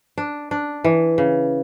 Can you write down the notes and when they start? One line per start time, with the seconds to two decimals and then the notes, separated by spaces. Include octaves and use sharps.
0.18 D4
0.51 D4
0.84 E3
1.18 C#3